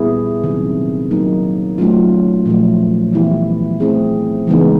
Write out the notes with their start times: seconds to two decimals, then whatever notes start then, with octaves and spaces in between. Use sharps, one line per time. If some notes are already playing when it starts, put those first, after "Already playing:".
Already playing: A#2 G3 B3 E4 G#4
0.44 C3 D#3 F#3
1.11 F#3 A#3 D#4
1.78 F#3 A3 C#4 F4
2.46 A#2 F3 A3
3.13 E3 G3 B3 E4 G4
3.80 A3 C4 E4 G#4
4.47 C#3 E3 G#3 B3 D#4